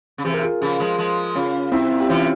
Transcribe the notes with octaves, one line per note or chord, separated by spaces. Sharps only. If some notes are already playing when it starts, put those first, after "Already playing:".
C#3
C3 E3 G#4
A#4
F4 G#4
C#3 F3 F4 G#4
F3 G#3
F3 G#3
C#3 C#4 F4
C3 C4 E4
A#2
G4
C3 E3 C#4 F4